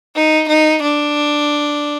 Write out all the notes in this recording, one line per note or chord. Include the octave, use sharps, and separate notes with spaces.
D#4
D#4
D4